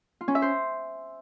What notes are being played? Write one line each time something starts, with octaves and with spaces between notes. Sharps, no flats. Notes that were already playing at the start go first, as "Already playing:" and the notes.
F4
C#4
E5
C5